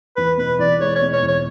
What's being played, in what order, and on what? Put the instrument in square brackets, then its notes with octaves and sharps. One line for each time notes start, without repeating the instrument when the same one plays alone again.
[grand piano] E2 [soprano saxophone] B4
[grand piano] B2 [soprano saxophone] B4
[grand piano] E2 [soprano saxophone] D5
[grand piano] G#3 [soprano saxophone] C#5
[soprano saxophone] C#5
[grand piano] B2
[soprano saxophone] C#5
[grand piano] E2
[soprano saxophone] C#5